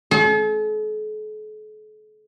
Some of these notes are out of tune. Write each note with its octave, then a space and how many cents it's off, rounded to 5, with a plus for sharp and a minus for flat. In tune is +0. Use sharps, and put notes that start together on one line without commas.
A4 -45